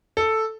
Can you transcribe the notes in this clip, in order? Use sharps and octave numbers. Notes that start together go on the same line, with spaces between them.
A4